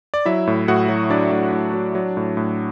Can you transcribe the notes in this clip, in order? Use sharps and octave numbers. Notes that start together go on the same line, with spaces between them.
D5
F#3 E4 E5
A2
A2 F#4 F#5
F#3
F#3 D4 D5
A2
A2
F#3
F#3
A2
A2